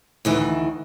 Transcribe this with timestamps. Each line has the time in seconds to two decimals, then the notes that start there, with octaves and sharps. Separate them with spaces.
0.25 D2 D#3 E3